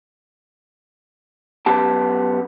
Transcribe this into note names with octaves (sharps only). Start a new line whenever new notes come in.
F#2 B3 G4 A5